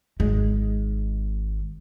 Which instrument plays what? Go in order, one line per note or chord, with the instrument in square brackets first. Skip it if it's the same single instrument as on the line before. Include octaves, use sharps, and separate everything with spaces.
[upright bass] G#1 G#3